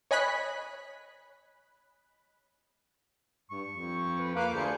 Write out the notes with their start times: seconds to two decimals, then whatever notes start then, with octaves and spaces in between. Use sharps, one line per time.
0.11 C#5 D#5 G#5 B5 F#6 B6
3.51 G2 C#6
3.69 F2
4.19 B4
4.35 A#3 B4 F5 D6
4.53 D2 G#4 C5 C#7